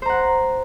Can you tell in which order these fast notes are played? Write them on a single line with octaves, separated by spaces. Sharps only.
C5 A#5 F#5